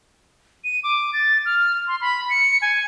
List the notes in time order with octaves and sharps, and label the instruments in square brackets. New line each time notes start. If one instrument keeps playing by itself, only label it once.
[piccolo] D#7
D6
A6
F6
C6
B5
C#7
G#5